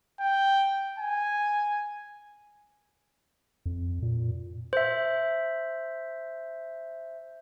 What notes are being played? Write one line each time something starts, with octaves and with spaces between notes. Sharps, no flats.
G5
G#5
F2
A#2
C5 E5